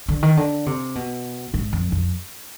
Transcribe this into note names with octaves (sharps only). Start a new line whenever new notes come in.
D3
D#3
D3
C3
B2
G#2
F2
F2